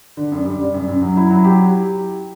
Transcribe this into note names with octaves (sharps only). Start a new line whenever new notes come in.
D3
F#2
G3
G3
F#2
F#2
F#3
E4
F#3
G4